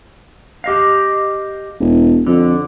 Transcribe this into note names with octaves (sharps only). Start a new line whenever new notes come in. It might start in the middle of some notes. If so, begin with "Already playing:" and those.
G4 D#5 F5
E1
F2 D3